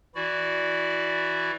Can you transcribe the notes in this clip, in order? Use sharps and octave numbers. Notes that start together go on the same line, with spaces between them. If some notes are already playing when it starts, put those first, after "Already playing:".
E3 E4 F#4 D5